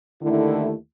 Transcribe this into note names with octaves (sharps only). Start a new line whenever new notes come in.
D#2 D3 D#3 A3 E4